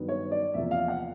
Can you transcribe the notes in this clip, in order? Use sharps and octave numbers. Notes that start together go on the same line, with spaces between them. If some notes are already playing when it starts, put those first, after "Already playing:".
Already playing: G2 D#3 F#3 B3
C#5
D5
E2 C3 F3 A#3 E5
F5
F#5